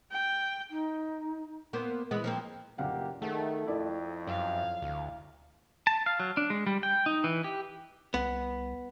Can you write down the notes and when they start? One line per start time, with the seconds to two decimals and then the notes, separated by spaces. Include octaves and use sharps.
0.12 G5
0.70 D#4
1.73 A#3 B3 C5
2.11 E3 G#3 B3
2.24 F3 A#3 C4
2.78 F#1 B1 A#2 G4 F5 F#5
3.22 D#3 A3 G#4 A4 F#5
3.66 F2 E4 D5 D#5
4.27 F#2 F5
4.82 D2
5.87 A5
6.06 F5
6.20 F#3
6.37 D4
6.50 G#3
6.67 G3
6.83 G5
7.06 D#4
7.24 E3
7.44 G4
8.14 C2 B3